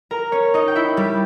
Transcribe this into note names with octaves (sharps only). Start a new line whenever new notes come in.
A#4 A#5
C#4 C#5
D#4 D#5
G5
E4 E5
G3 G4